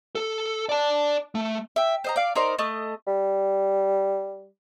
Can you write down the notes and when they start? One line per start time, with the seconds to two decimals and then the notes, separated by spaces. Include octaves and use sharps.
0.15 A4
0.69 D5 A5
1.35 A3
1.76 E5 G5
2.04 C5 D#5 A#5
2.16 D5 F5
2.35 D#4 A#4 C5 D5
2.59 A3 D#5
3.07 G3